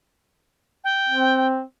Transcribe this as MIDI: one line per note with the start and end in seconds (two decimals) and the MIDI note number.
0.84 1.47 79
1.09 1.63 60